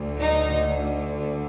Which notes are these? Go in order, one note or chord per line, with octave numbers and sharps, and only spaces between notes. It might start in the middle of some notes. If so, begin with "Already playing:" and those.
Already playing: D2 D3
D#4